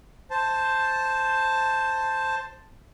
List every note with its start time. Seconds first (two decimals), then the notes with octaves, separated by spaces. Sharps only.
0.30 C5 A5